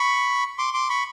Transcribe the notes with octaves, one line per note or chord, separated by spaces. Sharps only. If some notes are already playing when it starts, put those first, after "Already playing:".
Already playing: B5 C#6
C6 D6
C6 D6
B5 C#6